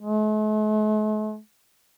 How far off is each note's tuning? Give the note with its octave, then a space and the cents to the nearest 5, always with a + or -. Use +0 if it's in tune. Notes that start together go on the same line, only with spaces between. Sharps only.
A3 -45